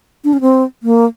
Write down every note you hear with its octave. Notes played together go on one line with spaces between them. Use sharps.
D4
C#4
C4
A#3